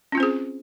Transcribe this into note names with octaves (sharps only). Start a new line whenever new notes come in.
C4 C#4 F4 G#4 C5